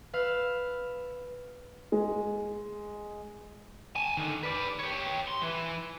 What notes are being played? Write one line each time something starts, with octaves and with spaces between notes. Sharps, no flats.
B4 F5 E6
G#3
G#5 A5
D3 D#3
B4 D5
G4 C#5
C6
E3